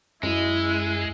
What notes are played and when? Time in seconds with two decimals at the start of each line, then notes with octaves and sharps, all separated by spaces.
0.23 F#2 G#3 E4